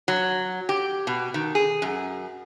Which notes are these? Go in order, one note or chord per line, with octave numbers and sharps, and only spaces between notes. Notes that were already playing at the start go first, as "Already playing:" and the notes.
F#3
G4
B2
D#3
G#4
F#2